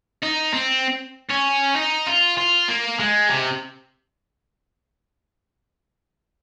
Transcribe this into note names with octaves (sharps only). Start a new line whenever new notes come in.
D#4
C4
C#4
D#4
F4
F4
A#3
G#3
C3